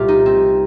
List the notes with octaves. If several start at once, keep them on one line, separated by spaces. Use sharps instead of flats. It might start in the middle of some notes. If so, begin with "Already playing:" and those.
Already playing: C2 A#2 F4 G4
D#4
C4